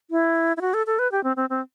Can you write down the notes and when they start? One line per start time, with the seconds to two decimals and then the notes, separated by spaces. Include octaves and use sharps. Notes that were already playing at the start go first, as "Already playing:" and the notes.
0.11 E4
0.57 E4
0.61 F#4
0.74 A4
0.86 A4
0.99 B4
1.12 G4
1.24 C4
1.36 C4
1.50 C4